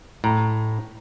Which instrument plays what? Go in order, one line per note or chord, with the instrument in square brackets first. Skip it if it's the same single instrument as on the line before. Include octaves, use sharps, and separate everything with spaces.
[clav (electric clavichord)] A2 [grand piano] A#5